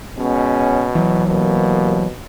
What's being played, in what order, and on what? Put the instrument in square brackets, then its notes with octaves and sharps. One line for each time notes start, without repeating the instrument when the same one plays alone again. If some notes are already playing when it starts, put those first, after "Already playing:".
[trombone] B2 [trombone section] G#3 B3 C#4
[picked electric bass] E3 F#3
[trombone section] C2 A#3 [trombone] B2